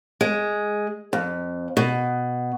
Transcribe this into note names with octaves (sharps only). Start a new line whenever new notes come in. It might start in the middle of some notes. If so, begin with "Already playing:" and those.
G#3
F2
B2